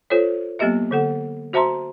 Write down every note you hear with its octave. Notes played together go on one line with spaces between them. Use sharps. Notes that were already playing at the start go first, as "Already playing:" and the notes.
F4 A4 C5 C#5
F#3 A#3 B3 G4 D#5 E5
D3 A4 F#5
F#4 C5 E5 A5 A#5 C6